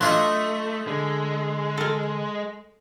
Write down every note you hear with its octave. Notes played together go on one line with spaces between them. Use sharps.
F#3 A3 D4 F4 D#5 E5 C6
D3 G#3
A4 A#4